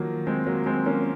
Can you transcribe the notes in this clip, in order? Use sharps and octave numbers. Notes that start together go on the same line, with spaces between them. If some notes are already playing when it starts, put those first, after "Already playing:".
Already playing: D#3 F3 F#3 A#3
G#3 C4
F#3 A#3
G#3 C4
A#3 C#4